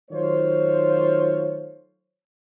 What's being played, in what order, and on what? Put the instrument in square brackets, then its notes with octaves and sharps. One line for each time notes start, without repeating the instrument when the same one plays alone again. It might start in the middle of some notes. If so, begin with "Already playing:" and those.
[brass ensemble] D#3 F#3 A3 F4 C5 C#5